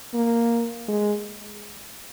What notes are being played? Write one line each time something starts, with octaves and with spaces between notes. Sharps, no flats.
A#3
G#3